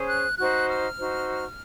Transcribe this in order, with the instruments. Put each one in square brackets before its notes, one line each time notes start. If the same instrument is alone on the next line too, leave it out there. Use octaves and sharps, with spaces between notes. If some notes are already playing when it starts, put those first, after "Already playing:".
Already playing: [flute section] C#4 G#4 C5
F#6
D#4 F#4 C5 F#6
F6
D#4 F#4 C5